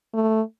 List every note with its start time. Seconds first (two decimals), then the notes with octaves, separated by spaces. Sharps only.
0.14 A3